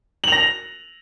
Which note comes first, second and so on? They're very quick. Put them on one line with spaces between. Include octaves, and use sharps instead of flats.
F#7 F7 A#6